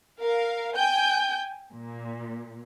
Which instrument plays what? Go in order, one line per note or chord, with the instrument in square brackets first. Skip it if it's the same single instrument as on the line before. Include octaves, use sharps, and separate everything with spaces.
[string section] A#4 F5
G5 G#5 G6
A#2